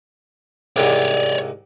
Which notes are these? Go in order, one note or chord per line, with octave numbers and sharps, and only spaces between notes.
C2 G#2 C3 C#5 D5